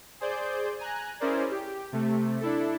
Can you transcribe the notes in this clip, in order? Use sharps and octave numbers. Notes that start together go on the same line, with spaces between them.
G#4 C5 D5 G6
G#5 A#5 F#6
C#4 E4 G#4 A#4 C5 D5
G4
C3 A3
D4 E4 A4